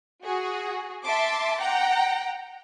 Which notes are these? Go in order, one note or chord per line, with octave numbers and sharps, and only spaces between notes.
F#4 G#4
E5 A5 C6 D6
F#5 G5 A#5